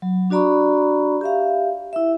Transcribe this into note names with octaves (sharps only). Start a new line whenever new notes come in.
F#3
D4 F#4 D5 A#5 B5 C#6
G4 E5 F5
E4 E5